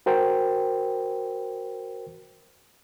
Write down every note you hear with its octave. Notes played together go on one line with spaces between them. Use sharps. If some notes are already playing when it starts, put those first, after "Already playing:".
F#4 A#4 C5 G5